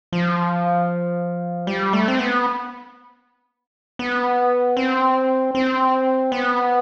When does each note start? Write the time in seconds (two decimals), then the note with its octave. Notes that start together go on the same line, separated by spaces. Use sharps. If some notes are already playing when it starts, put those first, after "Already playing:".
0.12 F3
1.67 G3
1.93 A3
2.08 C4
2.19 B3
3.99 B3
4.77 C4
5.55 C4
6.32 B3